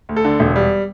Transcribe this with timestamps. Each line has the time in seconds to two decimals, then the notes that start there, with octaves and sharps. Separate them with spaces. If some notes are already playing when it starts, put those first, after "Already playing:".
0.09 D2
0.16 A4
0.25 D3
0.40 E1
0.56 G3